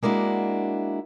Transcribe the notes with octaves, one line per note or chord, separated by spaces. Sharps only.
G#3 A#3 D4 E4 F#4